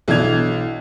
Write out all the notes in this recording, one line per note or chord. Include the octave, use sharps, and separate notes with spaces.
B1 E3 D4 G#6 F7